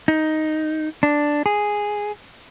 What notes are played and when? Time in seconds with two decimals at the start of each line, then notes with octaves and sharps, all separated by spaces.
0.08 D#4
1.03 D4
1.46 G#4